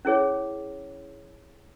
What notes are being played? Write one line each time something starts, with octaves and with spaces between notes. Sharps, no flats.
C#4 E4 G#4 C#5